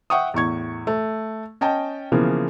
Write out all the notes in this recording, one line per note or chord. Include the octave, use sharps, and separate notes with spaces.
E5 F#5 G5 C#6 D#6
E2 A2 C#6 G#6
A3
C#4 D#5 G5 A5
C#3 E3 F3 A#3 B3